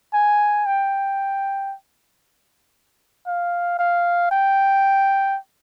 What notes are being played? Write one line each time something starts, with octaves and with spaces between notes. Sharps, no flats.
G#5
G5
F5
F5
G5